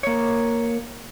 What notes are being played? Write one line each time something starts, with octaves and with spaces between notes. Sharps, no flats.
A#3 C#5